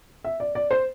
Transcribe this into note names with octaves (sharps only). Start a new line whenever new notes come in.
E5
D5
D5
C5